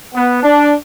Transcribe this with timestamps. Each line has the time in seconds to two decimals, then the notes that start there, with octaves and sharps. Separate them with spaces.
0.13 B3
0.42 D4